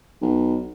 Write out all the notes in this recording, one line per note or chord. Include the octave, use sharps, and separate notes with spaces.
B1